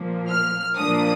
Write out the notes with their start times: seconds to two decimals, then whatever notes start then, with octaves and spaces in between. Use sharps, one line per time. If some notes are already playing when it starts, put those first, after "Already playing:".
Already playing: A#2 F3 A#3
0.30 F6
0.77 A#2 F3 A#3 D4 D#6